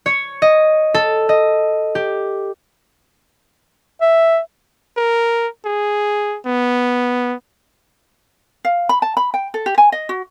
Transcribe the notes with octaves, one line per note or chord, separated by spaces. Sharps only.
C#5
D#5
A4
D#5
G4
E5
A#4
G#4
B3
F5
B5
A5
B5
G5
A4
G4
G#5
D#5
F#4